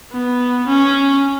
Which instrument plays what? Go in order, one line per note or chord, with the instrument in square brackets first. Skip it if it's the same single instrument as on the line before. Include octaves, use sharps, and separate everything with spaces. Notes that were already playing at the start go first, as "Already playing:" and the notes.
[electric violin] B3
C#4